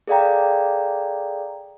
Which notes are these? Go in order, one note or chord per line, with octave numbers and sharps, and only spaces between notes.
G#4 A4 D5 F5 G5 A#5